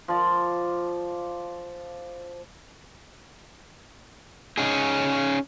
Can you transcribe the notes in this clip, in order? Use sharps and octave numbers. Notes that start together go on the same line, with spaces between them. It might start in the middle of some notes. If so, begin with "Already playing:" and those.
F3 D5
C#4 D#4 G#4